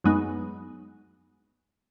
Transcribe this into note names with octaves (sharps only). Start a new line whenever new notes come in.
F#2 F#3 G#3 B3 D#4